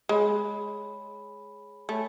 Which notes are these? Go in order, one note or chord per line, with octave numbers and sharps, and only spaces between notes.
G#3 G#4 C#5 G#5 B5
A3 C#5 G#5 B5